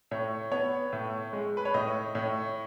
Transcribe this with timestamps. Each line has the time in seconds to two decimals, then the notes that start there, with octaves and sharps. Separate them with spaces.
0.11 A2 C#5
0.51 B3 C#5
0.93 A2
1.33 G#3
1.57 B4
1.65 C#5
1.74 A2 D#5
2.15 A2 C#5